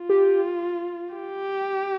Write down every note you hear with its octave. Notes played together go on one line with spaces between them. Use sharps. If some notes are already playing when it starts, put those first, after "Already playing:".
Already playing: F4
G4
G4